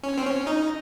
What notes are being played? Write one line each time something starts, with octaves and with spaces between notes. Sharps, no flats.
C#4
C4
C#4
D#4